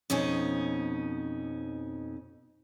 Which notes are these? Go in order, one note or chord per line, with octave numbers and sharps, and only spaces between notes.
F2 B2 C#4 D#4